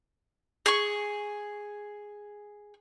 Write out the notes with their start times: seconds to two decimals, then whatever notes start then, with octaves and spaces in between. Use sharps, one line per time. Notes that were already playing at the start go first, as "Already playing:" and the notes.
0.66 G#4 C#6